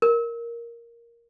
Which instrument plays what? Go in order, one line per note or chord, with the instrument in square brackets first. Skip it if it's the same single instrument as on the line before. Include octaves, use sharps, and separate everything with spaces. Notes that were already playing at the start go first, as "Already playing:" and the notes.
[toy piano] A#4